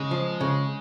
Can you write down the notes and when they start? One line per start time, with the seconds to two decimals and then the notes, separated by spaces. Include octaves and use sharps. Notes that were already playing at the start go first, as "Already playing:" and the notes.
Already playing: C#3 G#3
0.11 F3
0.41 C#3